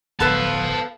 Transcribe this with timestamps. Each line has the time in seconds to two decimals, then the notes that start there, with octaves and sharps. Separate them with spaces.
0.20 D1 G1 F3 B3 A4 B4 F5 A5